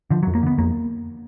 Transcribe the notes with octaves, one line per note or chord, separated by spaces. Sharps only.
D3 F3
F#3
F2
A#3
D3 B3
F2 A#3